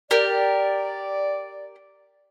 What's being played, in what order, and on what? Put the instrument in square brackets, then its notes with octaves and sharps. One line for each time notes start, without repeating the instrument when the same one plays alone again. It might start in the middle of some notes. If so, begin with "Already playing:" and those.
[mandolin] G4 A#4 [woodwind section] D5